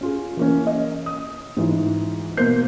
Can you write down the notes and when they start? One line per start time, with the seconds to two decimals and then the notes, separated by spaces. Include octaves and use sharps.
0.01 C#4 F4 G#4
0.37 E3 A#3 C#4
0.67 D#5
1.06 D#6
1.57 G#2 E3 F4
2.37 B2 A#3 C5 G6 C7